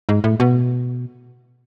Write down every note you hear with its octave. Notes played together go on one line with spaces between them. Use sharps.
G#2
A2
B2